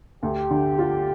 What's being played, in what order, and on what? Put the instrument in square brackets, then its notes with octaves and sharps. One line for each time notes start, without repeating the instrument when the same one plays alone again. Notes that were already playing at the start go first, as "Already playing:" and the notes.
[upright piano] D2 [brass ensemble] G4
[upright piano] D3
F4